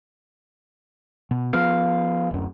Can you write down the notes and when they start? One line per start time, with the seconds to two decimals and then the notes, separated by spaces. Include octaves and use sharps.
1.31 B2
1.53 F3 B3 F5
2.31 D1 F#2